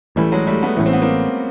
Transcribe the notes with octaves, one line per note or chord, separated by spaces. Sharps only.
A1 A2 E3 G3 A3
F#3 G#3
G3 A3
A3 B3
A1 A2 E3 C#4
C4
B3
A#3 C4